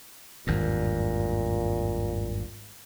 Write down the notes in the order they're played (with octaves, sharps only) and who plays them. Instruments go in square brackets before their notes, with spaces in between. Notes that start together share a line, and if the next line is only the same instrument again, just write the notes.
[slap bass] G#1 E2 G2 [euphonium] A#2